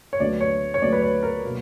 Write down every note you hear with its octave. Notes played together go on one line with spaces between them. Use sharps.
C#5
D2 D3 F#3 B3 D4 D5
C#5
C#5
D2 D3 F#3 B3 D4 D5
B4
C#5
A#4
B2 F#3 A#3